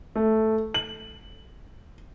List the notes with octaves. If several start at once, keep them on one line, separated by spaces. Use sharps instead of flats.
A3
F#7